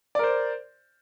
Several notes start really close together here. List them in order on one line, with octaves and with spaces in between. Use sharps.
D5 A#4 C5